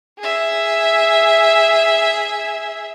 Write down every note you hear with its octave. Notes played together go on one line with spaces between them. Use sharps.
G#4 E5